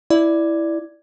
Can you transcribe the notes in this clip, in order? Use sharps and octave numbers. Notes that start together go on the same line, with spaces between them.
E4 D5